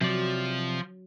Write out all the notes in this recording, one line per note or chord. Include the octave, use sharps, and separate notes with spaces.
C3 F3 F#3 D5